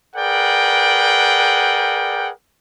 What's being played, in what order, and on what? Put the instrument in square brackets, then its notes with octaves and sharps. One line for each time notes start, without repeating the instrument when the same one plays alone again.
[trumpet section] G#4 A#4 B4 D5 F#5 G5